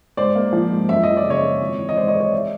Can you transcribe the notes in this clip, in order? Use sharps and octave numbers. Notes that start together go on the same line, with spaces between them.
G#2 C5 D5
A#3
F3
G#2
F#2 E5
F3 D#5
D5
C#3
C#5 D#5
G#3
G#1
E3
D#5
G#2 C5 D5
C#5 D#5
G#3
C#5 D#5
D5 E5